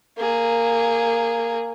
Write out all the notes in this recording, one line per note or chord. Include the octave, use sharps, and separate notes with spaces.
A#3 G#4